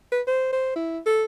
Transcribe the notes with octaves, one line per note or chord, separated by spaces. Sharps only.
B4
C5
C5
E4
A4